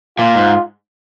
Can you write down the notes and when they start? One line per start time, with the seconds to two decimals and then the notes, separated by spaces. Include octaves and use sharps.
0.19 A#2 F4
0.36 G#2